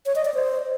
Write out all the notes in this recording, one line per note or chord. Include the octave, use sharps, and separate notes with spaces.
C#5
D#5
D5
C5